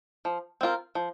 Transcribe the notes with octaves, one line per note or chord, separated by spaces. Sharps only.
F3
C4 F4 A#4
F3